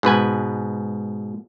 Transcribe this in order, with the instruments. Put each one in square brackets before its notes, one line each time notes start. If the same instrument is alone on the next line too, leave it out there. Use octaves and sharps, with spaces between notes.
[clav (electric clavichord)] G#2 B2 B4 G#5